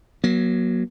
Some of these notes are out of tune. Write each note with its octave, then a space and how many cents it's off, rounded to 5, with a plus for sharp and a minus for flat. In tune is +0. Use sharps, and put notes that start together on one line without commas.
F#3 +0 A#3 +40